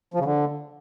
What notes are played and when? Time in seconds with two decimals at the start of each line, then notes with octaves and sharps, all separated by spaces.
0.14 F3
0.20 C#3
0.25 D3